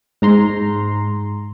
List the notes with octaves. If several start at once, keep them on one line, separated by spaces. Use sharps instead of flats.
G#2 A#5 C6